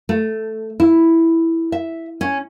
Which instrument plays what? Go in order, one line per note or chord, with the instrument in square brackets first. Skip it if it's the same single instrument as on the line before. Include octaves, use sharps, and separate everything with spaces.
[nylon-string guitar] A3
E4
E5
C#4